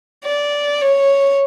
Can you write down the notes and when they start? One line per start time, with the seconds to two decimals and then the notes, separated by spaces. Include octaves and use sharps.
0.25 D5
0.81 C#5